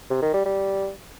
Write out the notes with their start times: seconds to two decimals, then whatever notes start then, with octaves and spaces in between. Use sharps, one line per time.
0.10 C3
0.22 D#3
0.33 G3
0.45 G3